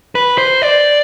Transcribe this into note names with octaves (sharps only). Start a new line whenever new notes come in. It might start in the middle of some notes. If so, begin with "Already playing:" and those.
B4
C5
D5